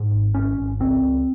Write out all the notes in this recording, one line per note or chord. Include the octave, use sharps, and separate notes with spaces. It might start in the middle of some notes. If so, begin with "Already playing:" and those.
Already playing: G#2
G#1
G#1 C#4
G#1
C#2 C4
C#2